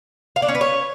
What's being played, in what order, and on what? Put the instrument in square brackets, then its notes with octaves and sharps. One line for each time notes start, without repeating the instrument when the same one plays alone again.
[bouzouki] F5
D4
C#4
B4
C#5